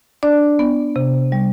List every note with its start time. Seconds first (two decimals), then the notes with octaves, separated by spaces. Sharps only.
0.23 D4 D5
0.59 B3
0.96 C3
1.32 G3